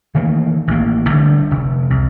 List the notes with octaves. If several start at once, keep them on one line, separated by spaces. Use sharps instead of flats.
D#3 E3 A3 A#3
A1 A#3
D3 G3 A3 D4
F1
C2